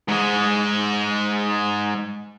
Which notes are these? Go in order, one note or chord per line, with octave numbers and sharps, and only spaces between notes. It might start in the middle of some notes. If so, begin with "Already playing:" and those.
G#2 G#3